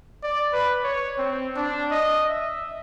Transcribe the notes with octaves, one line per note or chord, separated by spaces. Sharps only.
D5
B4
C#5
C4
D4
D#5
E5